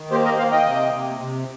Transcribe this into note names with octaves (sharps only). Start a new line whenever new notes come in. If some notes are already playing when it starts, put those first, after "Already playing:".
Already playing: D#3
A#3 G4 C5
A#4 D#5
A#3 C5 F5
D#5 G5
C3
C3
C3